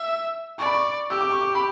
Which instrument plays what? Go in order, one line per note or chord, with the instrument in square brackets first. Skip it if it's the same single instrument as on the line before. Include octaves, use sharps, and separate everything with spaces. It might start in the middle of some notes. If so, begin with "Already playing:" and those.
Already playing: [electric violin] E5
[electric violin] D5 [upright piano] C#6
[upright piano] B5
C#6
[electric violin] G4 [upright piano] E6
[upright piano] D6
C#6
D6
B5